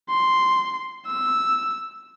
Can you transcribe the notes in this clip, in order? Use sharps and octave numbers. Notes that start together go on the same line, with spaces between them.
C6
E6